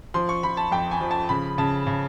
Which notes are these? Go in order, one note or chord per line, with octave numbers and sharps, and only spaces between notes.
F3 C6
C#6
F3 B5
A5
F2 G5
G#5
F3
A5
C#3 B5
C#3 A5
C#3